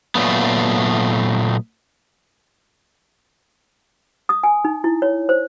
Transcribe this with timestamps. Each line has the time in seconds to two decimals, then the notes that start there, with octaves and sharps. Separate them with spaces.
0.15 A#2 F#3 A3 B3
4.29 D#6
4.43 G#5
4.65 D#4
4.84 E4
5.02 C#5
5.29 C5